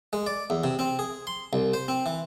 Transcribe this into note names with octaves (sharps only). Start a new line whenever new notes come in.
G#3
D5
E2
C3
C4
G#4
C6
C2
C5
C4
E3